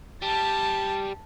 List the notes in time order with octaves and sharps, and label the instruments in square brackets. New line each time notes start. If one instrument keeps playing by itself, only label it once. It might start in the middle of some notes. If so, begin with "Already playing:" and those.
[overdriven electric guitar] G3 [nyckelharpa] A5